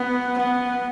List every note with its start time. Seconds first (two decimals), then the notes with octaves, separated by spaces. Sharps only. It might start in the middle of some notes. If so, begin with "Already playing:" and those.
Already playing: B3
0.38 B3